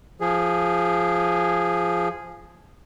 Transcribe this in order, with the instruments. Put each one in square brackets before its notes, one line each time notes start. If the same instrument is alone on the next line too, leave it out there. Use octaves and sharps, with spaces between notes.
[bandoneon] F3 G#4